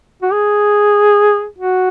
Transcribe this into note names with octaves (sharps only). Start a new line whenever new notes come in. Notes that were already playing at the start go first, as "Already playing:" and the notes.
F#4
G#4
F#4